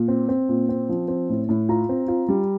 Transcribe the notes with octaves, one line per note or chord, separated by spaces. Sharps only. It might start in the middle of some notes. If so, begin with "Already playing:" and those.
Already playing: A#2
C4
C4
A#2
C4
F3
C4
A2
A2
F4 A#5
C4
F4
G3